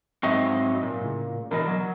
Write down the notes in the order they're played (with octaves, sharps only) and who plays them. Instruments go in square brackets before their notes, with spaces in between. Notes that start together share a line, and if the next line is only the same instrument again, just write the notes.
[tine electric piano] G#2 E5 C#6 [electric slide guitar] F#3 C4 D#5
[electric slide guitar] A#2
[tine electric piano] A2 C#3
[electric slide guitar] B2 E3 D#5 [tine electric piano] A#4
[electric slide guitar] F#3